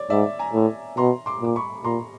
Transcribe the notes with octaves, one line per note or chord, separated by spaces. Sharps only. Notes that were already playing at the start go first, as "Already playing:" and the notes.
Already playing: C#5 D5
G#2 D5 E5
G#5 A#5
A2
B2 A#5 C6
C6 D6
A#2 D6
B5 C#6
A#2 A#5 C6